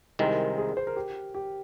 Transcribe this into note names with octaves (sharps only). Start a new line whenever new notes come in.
C2 C3 D#3 G#3 C4 A#4
G#4
C5
A#4
G4
G4